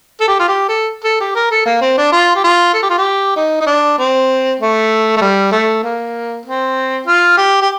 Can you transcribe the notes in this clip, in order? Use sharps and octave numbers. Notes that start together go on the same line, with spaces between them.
A4
G4
F4
G4
A4
A4
G4
A#4
A4
A#3
C4
D4
F4
G4
F4
A4
G4
F4
G4
D#4
D#4
D4
C4
A3
A3
G3
A3
A#3
C4
F4
G4
G4